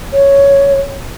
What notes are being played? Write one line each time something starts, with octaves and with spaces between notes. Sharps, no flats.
C#5